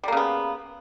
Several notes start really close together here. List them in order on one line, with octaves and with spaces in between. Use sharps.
G3 A#3 C#3 B3